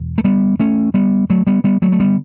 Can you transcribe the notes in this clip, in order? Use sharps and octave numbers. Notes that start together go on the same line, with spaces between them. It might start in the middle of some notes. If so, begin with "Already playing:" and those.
Already playing: E1
A3
G3 B3
A3 C#4
G3 B3
F#3 A3
G3 B3
G3 B3
F#3 A3
A3
D3 G3 B3